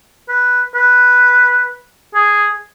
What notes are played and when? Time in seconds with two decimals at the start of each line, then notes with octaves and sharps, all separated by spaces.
0.29 B4
0.75 B4
2.15 G#4